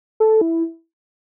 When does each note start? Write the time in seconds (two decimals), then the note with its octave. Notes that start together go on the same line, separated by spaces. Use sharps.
0.20 A4
0.41 E4